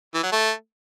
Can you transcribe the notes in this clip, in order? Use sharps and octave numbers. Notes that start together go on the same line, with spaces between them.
E3
F#3
A3